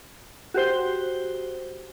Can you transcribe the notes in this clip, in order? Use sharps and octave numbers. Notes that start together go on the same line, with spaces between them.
F#4 G4 C5 G7